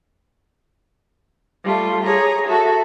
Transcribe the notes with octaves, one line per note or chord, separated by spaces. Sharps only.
G3 A3 F4
G#4 C#5 A#5
F#4 A4 E5